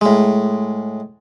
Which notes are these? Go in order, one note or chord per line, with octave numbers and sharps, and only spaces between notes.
A2 G#3